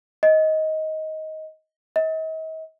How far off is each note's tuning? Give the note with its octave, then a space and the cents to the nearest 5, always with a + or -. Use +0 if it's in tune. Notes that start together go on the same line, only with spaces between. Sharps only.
D#5 +15
D#5 +45